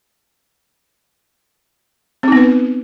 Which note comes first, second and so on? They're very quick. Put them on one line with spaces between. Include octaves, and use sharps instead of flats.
C4 D#4 B3 B4